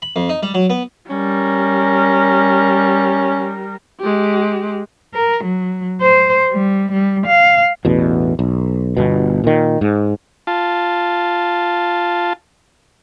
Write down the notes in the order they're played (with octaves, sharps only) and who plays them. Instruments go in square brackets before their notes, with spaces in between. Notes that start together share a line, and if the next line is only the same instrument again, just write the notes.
[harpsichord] B5
F2
D#4
G3
F#3
B3
[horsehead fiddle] G3 A#4 [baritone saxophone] C#4
[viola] G#3 G4
[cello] A#4
F#3
C5
G3
G3
F5
[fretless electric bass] A1 E2 B2
B1
G1 B2
A#2 D#3
G#2
[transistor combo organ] F4 A5